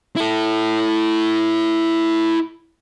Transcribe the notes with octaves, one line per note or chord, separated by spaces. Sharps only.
E4 A4